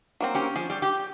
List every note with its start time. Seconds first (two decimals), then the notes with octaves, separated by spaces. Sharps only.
0.20 F#3 A#3 C4
0.35 C#4 G4
0.56 F3 G#4
0.70 G3 G4
0.82 G4